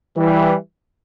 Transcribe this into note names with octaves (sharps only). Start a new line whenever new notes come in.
E3 G3